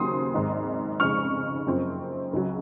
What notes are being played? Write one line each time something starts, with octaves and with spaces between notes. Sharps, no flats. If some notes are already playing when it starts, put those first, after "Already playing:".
Already playing: D#2 C#3 F#3 C4 C6 D#6
G#1 G#2 D#3
F1 F2 C#3 G#3 D#4 C#6 F6
F#1 F#2 F3 C4
C#2 C#3 F#3